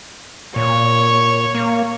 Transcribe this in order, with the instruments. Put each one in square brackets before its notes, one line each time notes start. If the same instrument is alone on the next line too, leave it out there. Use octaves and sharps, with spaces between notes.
[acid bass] A#2 [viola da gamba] C#5
[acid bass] A#3